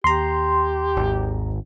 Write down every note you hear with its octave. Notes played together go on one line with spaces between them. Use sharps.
D#2 G4 A#5 C6
G#1